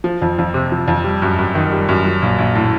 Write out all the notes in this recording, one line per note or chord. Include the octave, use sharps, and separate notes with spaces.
F3
F2
F2
C3
F3
F2
G3
F#2
F#2
D#3
G3
F#2
F#3
A#1
A#1
A2